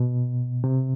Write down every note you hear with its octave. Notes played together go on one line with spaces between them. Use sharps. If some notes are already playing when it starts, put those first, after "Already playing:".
Already playing: B2
C3